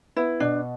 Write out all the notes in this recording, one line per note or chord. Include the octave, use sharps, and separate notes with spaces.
B3 E4
B2 D4